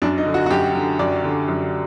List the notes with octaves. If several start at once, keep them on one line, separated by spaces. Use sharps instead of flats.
F#2 D4
D#4
D3
F#4
F#4
F#2 G4
D3
F#2 D5
D3
F#2